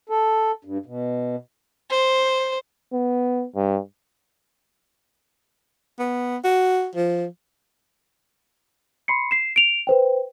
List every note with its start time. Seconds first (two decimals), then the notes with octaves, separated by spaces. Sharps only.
0.09 A4
0.65 G2
0.86 B2
1.90 C5
2.93 B3
3.56 G2
5.99 B3
6.44 F#4
6.96 F3
9.08 B5 C6 C7 C#7
9.31 C7 E7
9.56 D7 F7
9.87 B4 C5 G5